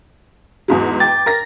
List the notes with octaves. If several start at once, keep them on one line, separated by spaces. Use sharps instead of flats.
E2 G#2 F#3
G5 D6 A6
A#4 A#6